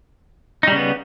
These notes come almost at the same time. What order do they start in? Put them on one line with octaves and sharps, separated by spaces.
D#4 G3 C#3 B3